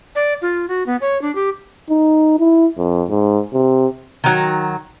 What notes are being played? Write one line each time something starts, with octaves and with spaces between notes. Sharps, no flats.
D5
F4
F#4
B3
C#5
D4
G4
D#4
E4
F2
G#2
C3
D#3 F#3